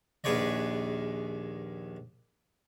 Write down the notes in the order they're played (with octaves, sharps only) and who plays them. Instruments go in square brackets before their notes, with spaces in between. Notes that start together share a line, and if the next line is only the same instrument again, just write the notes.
[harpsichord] A#1 D#2 G#4 B4 C#5 D5